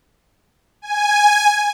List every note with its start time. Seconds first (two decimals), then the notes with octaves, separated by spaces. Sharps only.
0.82 G#5